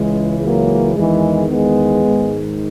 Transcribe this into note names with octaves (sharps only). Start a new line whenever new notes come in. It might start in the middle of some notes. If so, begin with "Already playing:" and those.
Already playing: C#2 C#3 E3 G#3
F#3 A#3
E2 D#3 E3 G#3
G#3 B3
G#2 D#3